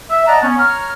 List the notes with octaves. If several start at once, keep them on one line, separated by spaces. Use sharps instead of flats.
E5
D5 D#5 F#5 A5 A#5
B3 C#4
C#5 A#5 F6